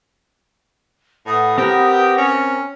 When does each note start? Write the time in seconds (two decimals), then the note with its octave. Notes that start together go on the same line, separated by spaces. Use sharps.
1.26 A2 B4 F#5 D#6
1.58 C4 G4 A#4
2.18 C#4